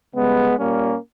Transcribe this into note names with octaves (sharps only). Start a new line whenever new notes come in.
C#3 G3 G#3 B3
A#2 G3 A#3 C#4